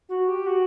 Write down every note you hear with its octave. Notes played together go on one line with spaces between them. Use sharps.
F#4
G4
F#4